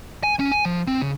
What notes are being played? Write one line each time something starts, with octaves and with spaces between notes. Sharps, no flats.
G#5
C#4
G#5
F3
C4
C#3